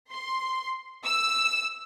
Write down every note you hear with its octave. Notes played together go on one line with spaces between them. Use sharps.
C6
E6